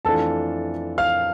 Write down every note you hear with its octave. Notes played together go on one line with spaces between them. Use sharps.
F2 E3 A3 D4 F4 A4 A5
F5 F6